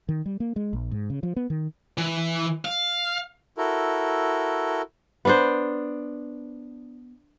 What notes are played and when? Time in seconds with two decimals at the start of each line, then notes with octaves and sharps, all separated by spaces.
0.09 D#3
0.26 G3
0.40 A#3
0.56 G#3
0.73 A#1
0.91 G#2
1.10 C#3
1.23 F3
1.36 B3
1.50 D#3
1.98 E3
2.65 F5
3.58 E4 F#4 A4 A#4
5.25 B3 D4 C5